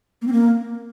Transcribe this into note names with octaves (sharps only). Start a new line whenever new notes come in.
A#3
C4
A#3